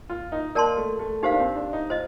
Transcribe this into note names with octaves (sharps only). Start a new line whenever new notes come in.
F4
D#4
A#3 A#4 D5 A5 C6
A3
A3
A#3 D#4 G4 C5 F5
D4
C4
D4
D#4
F4 C5 D#5